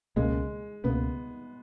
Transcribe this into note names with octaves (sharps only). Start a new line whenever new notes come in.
C#2 B2 G#3 A#3 C#4
C#2 B2 A#3 B3 C#4